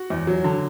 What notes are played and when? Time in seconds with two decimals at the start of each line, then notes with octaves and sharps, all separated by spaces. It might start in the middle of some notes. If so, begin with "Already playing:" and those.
Already playing: F#4
0.10 E2
0.27 F#3
0.44 D3